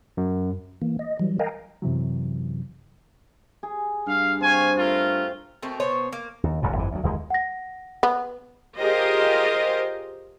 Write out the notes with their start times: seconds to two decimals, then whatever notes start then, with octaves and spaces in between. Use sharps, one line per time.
0.17 F#2
0.82 E3 A#3
0.99 D#5
1.19 E3 F#3 G3
1.39 A#4 D#5 F5 G5 G#5 A#5
1.82 F#2 C3 E3 F#3
3.63 G#4
4.07 G2 F5
4.41 C4 F5 G#5 C#6
4.77 A3 F4 A#4
5.62 B2 A3 C4 A#4
5.80 B2 B3 C5 C#5
6.13 A#3
6.43 D#2
6.62 D#1 C#2 G#2 B2
6.76 G1 F2 D#3 E3
6.91 D2 F#3
7.03 G1 D#2 G#3
7.30 F#5 A#6
8.03 B3
8.78 F4 G4 G#4 A#4 C5 D#5